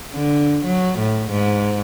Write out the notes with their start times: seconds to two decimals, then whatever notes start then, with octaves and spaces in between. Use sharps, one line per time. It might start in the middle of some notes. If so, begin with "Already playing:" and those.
0.13 D3
0.64 F#3
0.99 A2
1.31 G#2